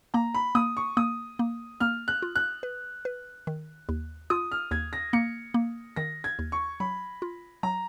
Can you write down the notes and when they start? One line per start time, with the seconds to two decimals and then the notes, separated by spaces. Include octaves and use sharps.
0.14 A#3 A#5
0.34 B5
0.55 A#3 D#6
0.77 C#6
0.97 A#3 D#6
1.39 A#3
1.80 A#3 F6
2.08 F#6
2.22 F4
2.36 F#6
2.63 B4
3.05 B4
3.47 D#3
3.89 D#2
4.30 F4 D#6
4.52 F6
4.71 D#2 G#6
4.93 A#6
5.13 A#3 C#7
5.54 A#3
5.96 D#3 A#6
6.24 G#6
6.39 D#2
6.52 C#6
6.80 F#3 B5
7.22 F4
7.63 F#3 A#5